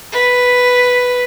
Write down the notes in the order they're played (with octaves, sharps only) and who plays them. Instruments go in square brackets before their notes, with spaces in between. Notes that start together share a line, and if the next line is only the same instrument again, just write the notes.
[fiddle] B4